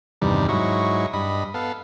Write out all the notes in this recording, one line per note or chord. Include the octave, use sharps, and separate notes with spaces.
E2 G2 C3 D#3 G3
G#2 F#3 E4 D#5 C#6
G2 D#5 B5
B3 A4 F5